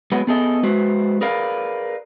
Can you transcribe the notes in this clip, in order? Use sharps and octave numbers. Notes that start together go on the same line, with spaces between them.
F#3 G#3 B3 B4
B3 G#4 A4 D#5
G#3 F#4 B4 C5
G#4 A#4 B4 D5 F5